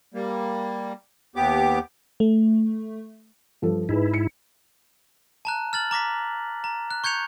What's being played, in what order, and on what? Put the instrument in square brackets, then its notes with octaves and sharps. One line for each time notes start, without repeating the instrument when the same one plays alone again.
[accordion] G3 A#3
D#2 B3 G4 D6
[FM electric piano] A3
[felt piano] G2 F3 A4
[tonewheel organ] G#2 E4 [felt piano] D#4 G#4 B4
[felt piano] C#7
[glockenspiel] A5 A#5 F#6
F6 A6 F#7
A#5 D6 A#6 B6
A#5
F#6
C#6 G6 G#6 C#7 F7